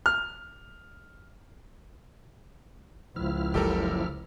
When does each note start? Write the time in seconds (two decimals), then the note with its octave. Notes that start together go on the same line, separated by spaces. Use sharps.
0.06 F6
3.16 C#2 F3 E4 F6
3.54 F#1 G4 A4 A#4